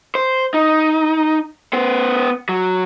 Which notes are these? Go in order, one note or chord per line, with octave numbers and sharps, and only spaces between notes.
C5
D#4
B3 C5
F#3